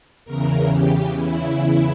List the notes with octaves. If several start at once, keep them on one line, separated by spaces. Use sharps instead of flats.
E2 C#3 E3 A#4
G4
E4